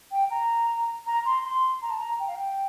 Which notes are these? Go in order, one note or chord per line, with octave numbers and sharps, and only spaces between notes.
G5
A#5
A#5
C6
C6
A#5
A5
A#5
G5
F5
G5